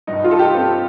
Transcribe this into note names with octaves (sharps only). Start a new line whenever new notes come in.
G2 D#4
F4
D#4 A4
G4
C4